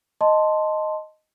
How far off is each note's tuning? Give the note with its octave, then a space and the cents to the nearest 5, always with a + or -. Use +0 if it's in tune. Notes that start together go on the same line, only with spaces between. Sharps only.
D#5 +0 A5 +0 C6 +0